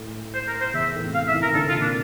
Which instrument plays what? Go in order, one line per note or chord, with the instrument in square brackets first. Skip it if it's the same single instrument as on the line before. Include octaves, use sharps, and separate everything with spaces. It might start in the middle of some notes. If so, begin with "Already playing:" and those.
Already playing: [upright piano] A2
[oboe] C5
A#4
C5
[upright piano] E2 [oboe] E5
[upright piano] A2
C3
[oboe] F5
E5
[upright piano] E3
[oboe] A#4
[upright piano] E3
[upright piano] D3 [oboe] A4
[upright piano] D3 [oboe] F4
[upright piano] A#2
[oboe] D4
[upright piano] C3